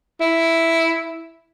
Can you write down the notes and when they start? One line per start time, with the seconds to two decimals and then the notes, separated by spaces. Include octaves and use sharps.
0.21 E4